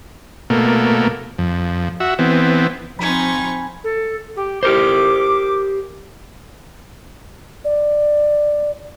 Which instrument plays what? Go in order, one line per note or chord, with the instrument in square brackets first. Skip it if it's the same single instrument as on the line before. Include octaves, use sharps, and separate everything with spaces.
[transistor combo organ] B2 A3 A#3
F2
F#4 E5
E3 B3 C4
[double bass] F3 C4 [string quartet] D#4 C#6 [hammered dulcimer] G#5 B5
[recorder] A4
G4
[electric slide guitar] G4 A#4 C5 [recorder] D6
[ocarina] D5